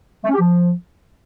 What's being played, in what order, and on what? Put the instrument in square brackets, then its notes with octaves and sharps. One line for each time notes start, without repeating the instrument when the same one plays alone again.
[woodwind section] A3
C#4
G4
F3